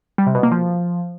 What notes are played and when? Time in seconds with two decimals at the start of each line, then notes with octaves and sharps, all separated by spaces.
0.18 G3
0.27 C3
0.35 B2
0.43 A#3
0.51 F3